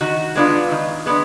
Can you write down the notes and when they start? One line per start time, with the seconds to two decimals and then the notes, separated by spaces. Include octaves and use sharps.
0.01 D#3 F#4
0.35 G#3 B3 D4 F4
0.71 D#3
1.06 G#3 B3 D4